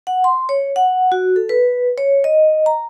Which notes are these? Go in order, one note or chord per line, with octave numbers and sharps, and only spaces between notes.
F#5
C6
C#5
F#5
F#4
A4
B4
C#5
D#5
A#5